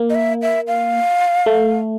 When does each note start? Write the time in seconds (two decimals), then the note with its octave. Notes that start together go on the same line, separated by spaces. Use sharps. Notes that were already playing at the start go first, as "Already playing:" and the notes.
Already playing: A#3
0.10 D#5
0.15 E5
0.42 E5
0.67 F5
1.46 A3